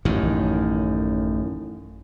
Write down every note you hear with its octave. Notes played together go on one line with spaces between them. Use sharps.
A1 F#2 D#3